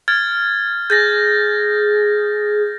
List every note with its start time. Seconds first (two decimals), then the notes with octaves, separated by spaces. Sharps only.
0.08 F6 G#6 A6
0.90 G#4 G6 A6 A#6